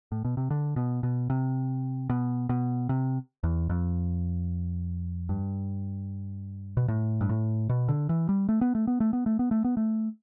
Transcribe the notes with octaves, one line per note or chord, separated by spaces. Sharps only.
A2
B2
C3
D3
B2
B2
C3
B2
B2
C3
E2
F2
G2
B2
A2
G2
A2
B2
D3
E3
G3
A3
B3
A3
B3
A3
B3
A3
B3
A3
B3
A3